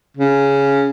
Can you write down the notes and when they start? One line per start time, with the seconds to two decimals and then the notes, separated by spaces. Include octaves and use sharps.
0.17 C#3